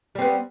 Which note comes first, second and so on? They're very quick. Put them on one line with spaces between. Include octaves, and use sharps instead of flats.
G3 C4 B3